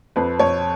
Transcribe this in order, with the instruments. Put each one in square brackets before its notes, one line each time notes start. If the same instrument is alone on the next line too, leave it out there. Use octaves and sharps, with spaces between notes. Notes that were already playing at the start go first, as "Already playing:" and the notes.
[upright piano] F2 B4
F2 C#5